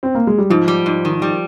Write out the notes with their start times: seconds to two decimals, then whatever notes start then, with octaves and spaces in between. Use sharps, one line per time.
0.03 C4
0.15 A#3
0.27 G#3
0.38 G3
0.50 G#2 F3
0.68 G3
0.86 G#2
1.05 D#3
1.22 G3